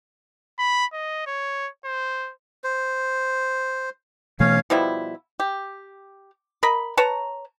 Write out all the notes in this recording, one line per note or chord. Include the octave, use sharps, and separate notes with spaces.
B5
D#5
C#5
C5
C5
B2 E3 A3 C#4 C#5 F5
B2 F3 G3 E4
G4
A#4 D#5 B5
B4 C#5 A5 A#5